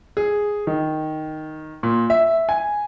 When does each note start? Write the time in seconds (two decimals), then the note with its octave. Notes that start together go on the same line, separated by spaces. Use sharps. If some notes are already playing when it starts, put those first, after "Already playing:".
0.17 G#4
0.67 D#3
1.83 A#2
2.10 E5
2.49 G#5